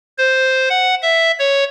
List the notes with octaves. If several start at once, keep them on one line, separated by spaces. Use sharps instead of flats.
C5
F#5
E5
C#5